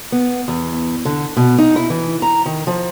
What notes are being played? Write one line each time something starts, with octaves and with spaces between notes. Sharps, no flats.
B3
E2
D3
B2
D#4
E4
E3
A#5
D#3
F3